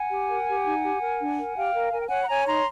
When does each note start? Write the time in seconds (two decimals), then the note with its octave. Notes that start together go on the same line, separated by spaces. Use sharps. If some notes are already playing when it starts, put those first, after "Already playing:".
Already playing: F#5 G#5
0.10 G4
0.29 A#4
0.48 G4
0.65 D#4
0.84 G4
1.01 A#4
1.20 D4
1.37 A#4
1.56 G4 F5 G5
1.73 A#4
1.91 A#4 G#5
1.99 G5
2.06 C#5 F#5 G#5
2.23 B5
2.28 C#5 G#5 A#5
2.42 B5
2.45 D#4 A#5 C6